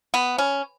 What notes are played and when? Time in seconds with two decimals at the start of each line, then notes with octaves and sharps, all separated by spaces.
0.14 B3
0.38 C#4